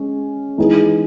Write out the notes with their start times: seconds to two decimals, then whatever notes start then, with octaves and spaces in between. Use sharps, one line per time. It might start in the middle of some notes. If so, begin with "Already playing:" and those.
Already playing: G#3 C#4
0.58 E3 G#3 B3 D#4 G#4